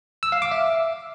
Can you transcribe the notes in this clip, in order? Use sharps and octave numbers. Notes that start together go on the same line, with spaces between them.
E6
F5
D6
E5